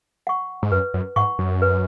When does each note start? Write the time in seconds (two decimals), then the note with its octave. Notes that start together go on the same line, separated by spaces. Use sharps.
0.27 F#5 C#6
0.63 G#2
0.72 F#2 B4
0.94 F#2
1.16 G#2 F#5 C#6
1.39 F#2
1.62 B4